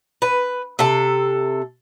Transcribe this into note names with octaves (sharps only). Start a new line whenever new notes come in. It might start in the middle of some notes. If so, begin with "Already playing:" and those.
B4
C3 A4